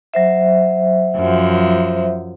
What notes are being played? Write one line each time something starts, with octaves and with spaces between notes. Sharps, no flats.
F#3 C5 E5
F#2 F3